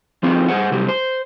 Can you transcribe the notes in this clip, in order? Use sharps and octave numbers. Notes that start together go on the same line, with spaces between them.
F3 C4 D#4 F4 G#4
G2 G#4 C5 F#5
C3 F#3 G3 G4
C5